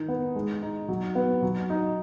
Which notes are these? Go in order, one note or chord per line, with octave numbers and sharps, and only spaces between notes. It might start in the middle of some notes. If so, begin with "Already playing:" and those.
Already playing: D#3 D#4
B3
G#3
D#4
F#3
B3
F#3
D#4